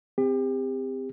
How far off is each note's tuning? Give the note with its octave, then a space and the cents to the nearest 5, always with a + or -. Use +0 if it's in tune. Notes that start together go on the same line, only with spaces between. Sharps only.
C4 -20 G4 +35